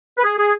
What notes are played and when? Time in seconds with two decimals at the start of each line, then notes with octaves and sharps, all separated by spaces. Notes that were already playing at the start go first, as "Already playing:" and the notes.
0.18 B4
0.23 G#4
0.38 G#4